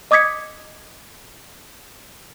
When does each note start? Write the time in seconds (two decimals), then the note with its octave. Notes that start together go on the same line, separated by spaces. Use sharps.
0.11 D#5 D6 D#6 G#6 B6 C#7